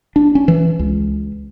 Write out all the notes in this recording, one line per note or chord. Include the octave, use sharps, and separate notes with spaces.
D4
C#4
E3
C#2